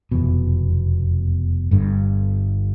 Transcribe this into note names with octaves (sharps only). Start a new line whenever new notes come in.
F1 E2 B2
G1 G2 D3